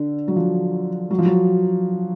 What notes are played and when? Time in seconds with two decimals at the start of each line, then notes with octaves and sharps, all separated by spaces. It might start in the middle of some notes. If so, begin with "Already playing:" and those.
Already playing: D3
0.28 F#3
0.36 F3
1.11 F#3
1.18 F3
1.26 F#3